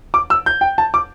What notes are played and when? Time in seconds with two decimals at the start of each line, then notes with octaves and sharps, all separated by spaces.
0.14 D6
0.30 E6
0.46 G6
0.61 G5
0.78 A5
0.94 D6